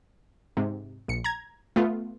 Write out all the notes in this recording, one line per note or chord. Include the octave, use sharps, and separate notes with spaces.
G#2 C3
A#1 C#7
A#5 G#6
A3 B3 F4